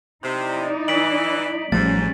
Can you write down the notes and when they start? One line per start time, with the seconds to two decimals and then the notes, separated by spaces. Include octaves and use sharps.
0.24 C3 D#4 E4 D5
0.88 E3 B6 D7 F#7
1.72 A1 G#2 F3 G3 A3 C#4 A6